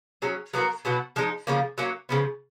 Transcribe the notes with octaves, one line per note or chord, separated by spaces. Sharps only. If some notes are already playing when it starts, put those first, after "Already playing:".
F#3 C#4 G#4
F#3 B3 F#4 A#4
B2 F#3 B3 F#4
F3 G#3 D#4
C#3 F3 A#3 C#4
F#3 A#3 C#4
C#3 F3 B3